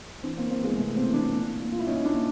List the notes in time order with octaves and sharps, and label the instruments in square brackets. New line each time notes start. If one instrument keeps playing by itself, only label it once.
[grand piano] E3 C4 D4
A#3 C4
E3 A#3 C4
B3
G#3 A#3
C3 A3 B3
A#3 C4
E3
C4 D4
A#2
A#2
F4
E4
A#2 C#4 D#4
D4 E4
A#2